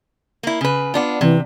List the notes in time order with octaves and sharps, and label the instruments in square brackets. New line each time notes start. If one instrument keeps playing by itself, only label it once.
[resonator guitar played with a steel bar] A#3 E4
C#3 B4
B3 D4 F4
[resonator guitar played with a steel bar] C3 [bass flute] E3